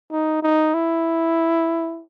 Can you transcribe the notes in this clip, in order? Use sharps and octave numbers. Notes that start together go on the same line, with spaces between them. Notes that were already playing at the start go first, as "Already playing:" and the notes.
D#4
D#4
E4